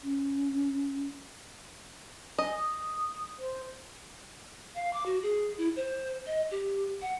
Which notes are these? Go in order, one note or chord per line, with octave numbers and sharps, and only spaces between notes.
C#4
D#5 G#5
D#6
C5
F5
D6
F#4
G#4
E4
C5
D#5
G4
F#5